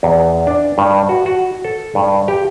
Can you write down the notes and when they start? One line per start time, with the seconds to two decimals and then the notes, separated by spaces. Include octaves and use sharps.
0.03 E2
0.47 D4
0.78 G2
1.09 F#4
1.26 F#4
1.64 A4
1.95 G2
2.28 G4